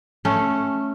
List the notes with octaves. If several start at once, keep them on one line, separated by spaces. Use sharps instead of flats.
A3 C#4